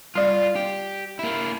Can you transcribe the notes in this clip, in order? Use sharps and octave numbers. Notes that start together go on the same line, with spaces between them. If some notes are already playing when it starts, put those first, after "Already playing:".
G3 F4 D5
G4
A#3 E4